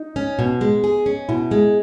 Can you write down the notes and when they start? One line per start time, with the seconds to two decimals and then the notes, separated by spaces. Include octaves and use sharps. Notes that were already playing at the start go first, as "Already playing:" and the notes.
Already playing: D#4
0.16 C#4
0.39 B2
0.61 G#3
0.84 G#4
1.06 C#4
1.28 B2 E4
1.51 G#3